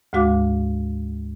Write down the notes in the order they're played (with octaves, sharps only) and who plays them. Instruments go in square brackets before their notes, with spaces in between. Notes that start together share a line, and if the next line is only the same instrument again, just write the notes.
[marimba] D2 G#2 G#3 F#4 F5 D6